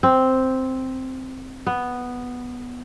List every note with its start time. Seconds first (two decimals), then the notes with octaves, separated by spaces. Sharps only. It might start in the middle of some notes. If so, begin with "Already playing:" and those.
0.03 C4
1.67 B3